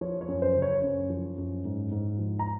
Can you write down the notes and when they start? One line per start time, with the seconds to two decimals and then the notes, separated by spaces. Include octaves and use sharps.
0.01 F3 C#5
0.21 C#5
0.28 F#2
0.42 C5
0.56 C#3
0.62 C#5
0.83 F#2
1.10 F3
1.38 F#2
1.65 G#2
1.91 G#2
2.19 F3
2.39 A#5